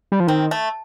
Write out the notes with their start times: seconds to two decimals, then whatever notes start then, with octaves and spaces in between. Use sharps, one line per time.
0.12 G3
0.20 F3
0.27 D#3 C4
0.51 A3